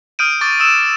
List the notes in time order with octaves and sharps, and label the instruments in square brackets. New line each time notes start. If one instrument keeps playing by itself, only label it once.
[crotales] D#6 F6 G6 D7 D#7
C#6 D6 A6
D#6 E6 E7